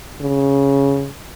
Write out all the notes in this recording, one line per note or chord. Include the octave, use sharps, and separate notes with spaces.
C#3